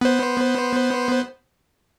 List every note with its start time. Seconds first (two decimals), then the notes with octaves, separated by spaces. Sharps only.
0.01 B3 C5